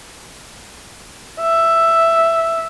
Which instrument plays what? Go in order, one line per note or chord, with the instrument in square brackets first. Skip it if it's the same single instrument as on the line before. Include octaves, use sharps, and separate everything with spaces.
[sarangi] E5